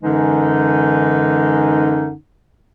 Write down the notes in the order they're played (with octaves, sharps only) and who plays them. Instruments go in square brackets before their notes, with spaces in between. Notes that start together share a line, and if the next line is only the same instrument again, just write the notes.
[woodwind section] F#2 D3 E3 G#3 C#4 D#4